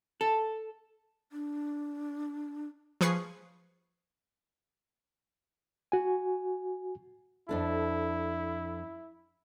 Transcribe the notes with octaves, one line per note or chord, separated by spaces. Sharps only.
A4
D4
F3 G#4 B4 C#6 C7
F#4 G#5
F2 D4 E4 A4